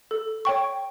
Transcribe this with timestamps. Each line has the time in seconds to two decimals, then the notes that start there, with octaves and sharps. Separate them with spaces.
0.11 A4
0.45 C#5 G5 C#6